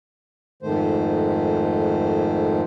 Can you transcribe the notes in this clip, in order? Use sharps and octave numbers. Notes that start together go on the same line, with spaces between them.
F2 G#2 D#3 A3 C5